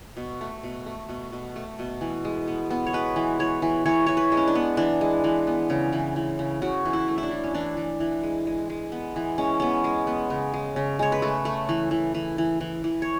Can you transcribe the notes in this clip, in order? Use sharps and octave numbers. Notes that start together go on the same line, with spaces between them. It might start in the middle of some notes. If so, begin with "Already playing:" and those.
B2
A3
B2
A3
B2
B2
A3
B2
E3
G#3
B3
B3
C#5
G#3 B4
E3
E3 C#5
E3
E3 C#5
E3 C#5
B4
G#3
C#4
D4
B3
E3 D4
G#3
E3
B3
C#3
E3
E3
C#3
C#3 F#4
E3
E4
A3
E4
D4
E3
C#4
E3 D4
E3
E3
G#3
G#3
G#3
B3
E3
G#3 C#4
B3 C#4
G#3
B3
C#3
G#3
C#3
G#3 C#5
B4
A3 A4
A3
E3
E3
E3
E3
E3
E3
C#5